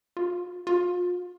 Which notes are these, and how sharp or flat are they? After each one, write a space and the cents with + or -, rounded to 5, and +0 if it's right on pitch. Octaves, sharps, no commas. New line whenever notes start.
F4 +30
F4 +35